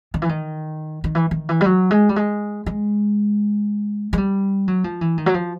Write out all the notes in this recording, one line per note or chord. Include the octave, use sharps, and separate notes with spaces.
D#3
E3
D#3
D#3
E3
D#3
E3
G3
F#3
G#3
G3
G#3
G#3
G#3
G3
F#3
F3
E3
D#3
F#3
F3